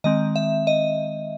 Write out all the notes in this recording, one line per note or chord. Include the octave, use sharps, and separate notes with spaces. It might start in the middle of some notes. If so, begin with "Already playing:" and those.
D#3 G#3 C4 D#5
E5
D#5